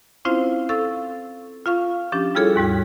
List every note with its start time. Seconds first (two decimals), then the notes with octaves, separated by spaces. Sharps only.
0.25 C4 C#4 E4 F4 C5 F5
0.69 A4 F5 C#6 E6 A6
1.66 F4 F5 C#6
2.12 F3 C#4 D4 G4
2.35 G3 E4 F4 G#4 A4 C#5
2.56 D#2 G#2 G3 F#4